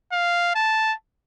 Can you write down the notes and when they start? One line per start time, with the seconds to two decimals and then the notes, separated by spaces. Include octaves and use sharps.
0.12 F5
0.55 A5